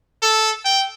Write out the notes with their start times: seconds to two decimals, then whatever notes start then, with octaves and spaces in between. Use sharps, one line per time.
0.22 A4
0.65 G5